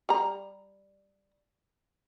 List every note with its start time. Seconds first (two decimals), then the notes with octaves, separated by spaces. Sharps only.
0.09 G3 A#5